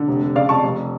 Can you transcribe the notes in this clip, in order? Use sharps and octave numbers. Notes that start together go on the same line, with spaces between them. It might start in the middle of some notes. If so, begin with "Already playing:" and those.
Already playing: D3
F1
F1
C#3 D5 F5
F2 A5 C#6
F1